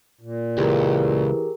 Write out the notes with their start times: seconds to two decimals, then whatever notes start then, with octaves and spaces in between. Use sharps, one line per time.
0.21 A#2
0.58 C#2 E3 G4 G#4 A#4